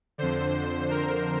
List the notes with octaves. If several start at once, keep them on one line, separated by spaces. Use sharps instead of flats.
F2 D3 C5
A#4